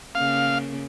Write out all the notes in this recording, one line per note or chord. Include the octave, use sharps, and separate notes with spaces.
C#3 A#3 F5